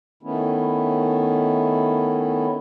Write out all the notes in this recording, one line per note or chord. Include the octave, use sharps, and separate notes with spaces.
D#3 A3 B3 C#4 E4